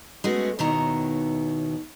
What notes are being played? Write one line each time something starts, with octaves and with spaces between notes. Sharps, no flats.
G#3 A3 B3 C#4 F#4
D#2 B2 D#3 E4 C#5 A#5